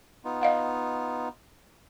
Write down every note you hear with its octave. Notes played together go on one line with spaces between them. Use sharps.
B3 D#4 F4
D#5 F5 F#5